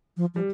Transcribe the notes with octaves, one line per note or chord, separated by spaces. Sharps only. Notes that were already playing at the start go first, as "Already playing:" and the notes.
F3
F3 G3